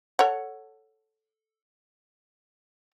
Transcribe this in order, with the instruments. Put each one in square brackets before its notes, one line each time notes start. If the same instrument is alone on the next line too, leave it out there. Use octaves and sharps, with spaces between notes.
[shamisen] A4 C#5 F#5